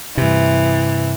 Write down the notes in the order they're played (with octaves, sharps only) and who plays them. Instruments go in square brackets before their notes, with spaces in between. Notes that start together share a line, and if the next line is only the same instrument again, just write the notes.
[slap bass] G2 C3 [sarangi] E3